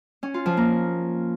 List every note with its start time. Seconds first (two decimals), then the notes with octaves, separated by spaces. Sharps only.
0.23 C#4
0.34 F4
0.46 F3
0.57 A#3